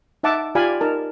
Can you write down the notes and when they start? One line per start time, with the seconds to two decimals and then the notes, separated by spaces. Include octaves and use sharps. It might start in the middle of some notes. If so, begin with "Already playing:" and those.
0.23 D#4 E5 F#5 A5 D6
0.55 F4 G4 D5 F5 G#5 B5
0.81 D#4 A#4 A5